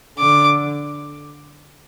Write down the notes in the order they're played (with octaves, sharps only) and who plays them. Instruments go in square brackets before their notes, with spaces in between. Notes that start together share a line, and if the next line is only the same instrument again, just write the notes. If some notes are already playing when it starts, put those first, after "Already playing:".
[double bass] D3 [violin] D6